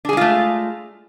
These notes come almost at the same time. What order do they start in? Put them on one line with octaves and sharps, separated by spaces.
D4 G#4 G#3 F4 A3